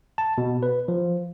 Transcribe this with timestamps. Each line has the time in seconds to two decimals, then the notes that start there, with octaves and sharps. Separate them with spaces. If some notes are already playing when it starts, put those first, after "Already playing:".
0.18 A5
0.38 B2
0.63 B4
0.88 F3